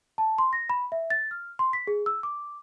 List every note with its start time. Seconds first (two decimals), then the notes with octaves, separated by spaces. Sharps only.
0.18 A5
0.38 C6
0.53 A#6
0.70 B5
0.92 E5
1.10 A6
1.31 F6
1.59 C6
1.73 B6
1.87 G#4
2.06 E6
2.23 D6